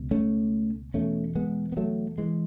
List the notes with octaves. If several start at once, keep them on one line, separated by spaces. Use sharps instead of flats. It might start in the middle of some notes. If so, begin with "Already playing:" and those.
Already playing: C#2 B2
A3 C#4
E2 B2 A3 C#4
G#3 B3
B3
F#3 A3
E3 G#3